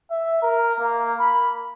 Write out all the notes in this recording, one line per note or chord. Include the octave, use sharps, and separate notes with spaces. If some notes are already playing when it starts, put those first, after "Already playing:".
E5
A#4
A#3
B5